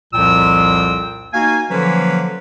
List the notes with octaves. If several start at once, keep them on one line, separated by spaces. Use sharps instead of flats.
C2 F2 A#2 F3 G5 E6
A#3 D#4 F#4 F5 G#5
D3 F3 F#3 A#3 C#4 B4